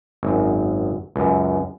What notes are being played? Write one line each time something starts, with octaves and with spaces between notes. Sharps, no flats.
G#1 F#2
C#2 F#2